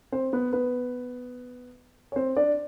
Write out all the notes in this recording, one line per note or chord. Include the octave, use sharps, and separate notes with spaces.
C4 C5
B3 B4
B3 B4
C#5
C4 C5
D4 D5